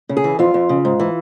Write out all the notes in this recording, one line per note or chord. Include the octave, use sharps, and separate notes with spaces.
C#3
G#4
E3
F2 F4
F2
C#3
G#2
E3